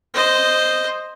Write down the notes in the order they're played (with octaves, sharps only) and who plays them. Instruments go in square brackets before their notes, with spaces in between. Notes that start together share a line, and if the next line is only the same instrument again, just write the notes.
[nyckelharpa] C5 D#5